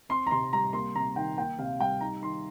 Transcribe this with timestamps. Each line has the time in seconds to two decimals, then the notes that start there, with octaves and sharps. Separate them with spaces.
0.09 C4 C6
0.27 A#5
0.31 C3 C6
0.53 G3 A#5
0.73 A#3 C6
0.95 C3 A#5
1.16 D#3 G5
1.38 A#3 G5
1.58 C3 F5
1.79 G3 G5
2.01 D#4 A#5
2.22 D#3 C6